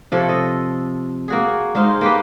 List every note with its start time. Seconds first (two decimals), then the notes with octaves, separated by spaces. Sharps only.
0.12 C3 F3 A4 C#5
0.29 D#5
1.28 A#3 F#4 G#4
1.75 G#3 D#4 C5 F5
2.01 A#3 G4 B4